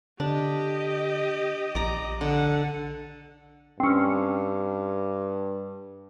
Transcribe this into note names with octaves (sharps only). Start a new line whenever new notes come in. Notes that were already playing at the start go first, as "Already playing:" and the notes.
D3 D4 G4 D#5
A#1 D5 A#5
D3 F#5
G2 C4 C#4